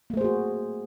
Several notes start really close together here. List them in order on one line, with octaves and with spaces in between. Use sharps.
A#3 A3 C5 G#4 F#4